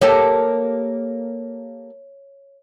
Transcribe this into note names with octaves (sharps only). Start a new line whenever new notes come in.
A#3 G4 A4 C#5